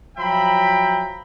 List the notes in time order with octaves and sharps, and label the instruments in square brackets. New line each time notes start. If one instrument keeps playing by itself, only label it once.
[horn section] F3 F#3 E5 G5 A#5 B5